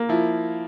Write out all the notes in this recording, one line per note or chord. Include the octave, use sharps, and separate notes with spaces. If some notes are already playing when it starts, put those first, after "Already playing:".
Already playing: A#3
F3 E4